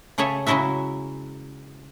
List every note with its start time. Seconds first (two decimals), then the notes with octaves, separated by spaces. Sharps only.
0.18 C#3 G#4 A4 C#5 E5
0.47 C#3 F#3 G#3 E4 F#4 E5